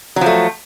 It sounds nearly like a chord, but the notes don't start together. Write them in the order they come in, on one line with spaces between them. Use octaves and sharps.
F#3 F3 A3